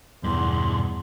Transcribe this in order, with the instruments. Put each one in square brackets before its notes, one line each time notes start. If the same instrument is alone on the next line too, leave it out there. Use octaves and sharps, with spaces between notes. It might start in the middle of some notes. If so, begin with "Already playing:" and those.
[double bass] E2 [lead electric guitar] G2 B2 [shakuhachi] C6